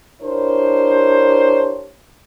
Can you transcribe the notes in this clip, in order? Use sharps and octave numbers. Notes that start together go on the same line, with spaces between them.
D4 E4 G4 A#4 C5 C#5